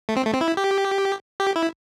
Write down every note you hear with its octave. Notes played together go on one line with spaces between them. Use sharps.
A3
C4
A3
C4
E4
G4
G4
E4